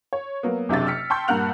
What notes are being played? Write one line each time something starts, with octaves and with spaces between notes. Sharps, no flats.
C#5
F#3 A#3 B3
F#1 C3 D4 E5 A6
E6 F6 B6 C#7
G5 A5 C6 C#6 G6
G2 A#2 A#4 F#5 F#6 F7